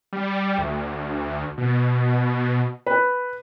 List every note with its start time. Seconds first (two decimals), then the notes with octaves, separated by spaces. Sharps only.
0.13 G3
0.58 D2
1.58 B2
2.86 B4